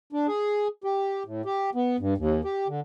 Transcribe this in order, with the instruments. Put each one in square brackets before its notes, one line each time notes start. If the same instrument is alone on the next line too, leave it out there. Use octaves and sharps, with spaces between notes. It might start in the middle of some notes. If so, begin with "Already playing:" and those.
[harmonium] D4
G#4
G4
A2
G4
B3
G2
D#2
G4
D3